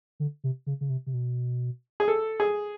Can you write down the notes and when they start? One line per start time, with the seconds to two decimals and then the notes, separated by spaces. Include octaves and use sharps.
0.20 D3
0.44 C3
0.67 C#3
0.81 C#3
0.90 C3
1.07 C3
1.14 B2
2.00 G#4
2.08 A4
2.40 G#4